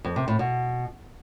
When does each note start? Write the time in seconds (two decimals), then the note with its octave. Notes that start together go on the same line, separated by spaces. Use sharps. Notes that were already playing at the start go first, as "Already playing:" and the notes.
0.05 F2
0.16 C3
0.28 A2
0.39 B2